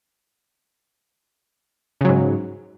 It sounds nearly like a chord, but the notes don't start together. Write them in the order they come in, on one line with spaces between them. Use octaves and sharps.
C#3 F#3 G#2